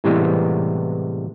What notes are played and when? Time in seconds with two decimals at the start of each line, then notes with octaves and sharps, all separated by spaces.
0.04 A2 C3 E3 G3 G#3 B3